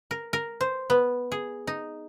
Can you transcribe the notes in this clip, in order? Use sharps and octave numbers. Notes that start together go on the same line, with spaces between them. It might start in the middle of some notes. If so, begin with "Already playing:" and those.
A#4
A#4
C5
B3
G#4
D#4